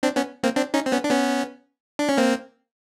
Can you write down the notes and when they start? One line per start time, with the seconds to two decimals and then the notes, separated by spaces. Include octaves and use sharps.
0.03 C4 D4
0.16 B3 C#4
0.43 A#3 C4
0.56 C4 D4
0.74 C#4 D#4
0.86 C4
0.92 B3 C#4
1.04 D4
1.10 B3 C#4
1.99 D4
2.09 C#4
2.18 A#3 C4